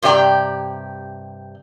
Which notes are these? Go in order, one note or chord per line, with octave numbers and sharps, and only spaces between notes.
G2 C3 G4 D5 G5 A#5